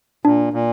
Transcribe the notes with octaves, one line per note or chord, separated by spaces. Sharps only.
A#2 D4
A#2